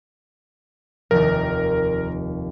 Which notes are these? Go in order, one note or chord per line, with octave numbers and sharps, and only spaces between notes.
F1 D#2 A#4